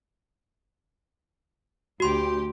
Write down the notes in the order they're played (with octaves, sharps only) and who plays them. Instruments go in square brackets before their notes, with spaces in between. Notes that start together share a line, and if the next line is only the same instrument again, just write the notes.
[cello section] D2 G4 [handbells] F#4 C6